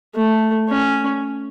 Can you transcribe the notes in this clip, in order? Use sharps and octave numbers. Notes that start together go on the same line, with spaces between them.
A3
C#4